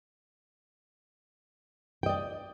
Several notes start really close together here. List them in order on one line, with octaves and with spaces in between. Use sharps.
G5 D#5 D5